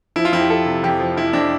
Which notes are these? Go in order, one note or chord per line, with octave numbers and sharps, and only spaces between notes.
F3 E4
F4
F2 E4
G4
F3 A4
C3
F2 G4
F3
F2 E4
F2 D4